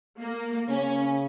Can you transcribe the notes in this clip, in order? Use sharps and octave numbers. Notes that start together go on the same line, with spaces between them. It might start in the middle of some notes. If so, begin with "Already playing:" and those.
A#3
C#3 C#4